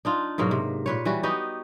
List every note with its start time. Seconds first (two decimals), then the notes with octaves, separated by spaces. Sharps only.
0.05 D4 D#4 F4
0.38 G#2 B2 F#3 A#3
0.51 C3
0.86 A#2 B4 C#5
1.05 E3 G3 F#4
1.23 B3 D#4 F#4 G4